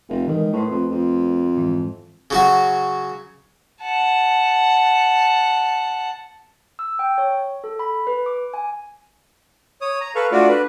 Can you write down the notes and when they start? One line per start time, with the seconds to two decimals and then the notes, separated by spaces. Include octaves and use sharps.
0.09 F1
0.27 D#3 E3 F#3 G#3
0.53 A2 A3 B4 C5
0.70 F2
0.90 F2
1.56 G#2 E3
2.30 C#3 F#3 F#4
3.82 F#5 A5
6.79 E6
6.99 G5
7.18 C#5
7.64 A4
7.79 B5
8.07 B4
8.26 D6
8.54 G#5
9.81 C#5 D#6
10.01 A#5
10.15 A4 B4 F5 C#6
10.32 A3 D4 F4 F#4 D5
10.48 D4 B4